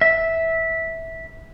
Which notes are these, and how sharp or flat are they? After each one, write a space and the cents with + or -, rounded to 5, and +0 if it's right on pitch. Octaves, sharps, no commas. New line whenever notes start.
E5 -10